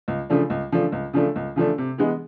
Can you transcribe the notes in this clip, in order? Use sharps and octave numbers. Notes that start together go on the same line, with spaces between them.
C#2
C#3 F3 A3 D4
C#2
C#3 F3 A3 D4
C#2
C#3 F3 A3 D4
C#2
C#3 F3 A3 D4
C3
E3 G#3 B3